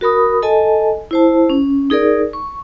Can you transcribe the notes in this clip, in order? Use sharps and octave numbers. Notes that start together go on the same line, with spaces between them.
F#4 A#4 B5 D#6
A4 D#5 G#5 A5
E4 C5 A5
C#4
D#4 G#4 A#4 D5
C#6